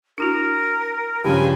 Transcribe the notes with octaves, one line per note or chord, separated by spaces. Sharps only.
D4 E4 F#4 A#4
G2 C#3 F3 G3 C#4 G#5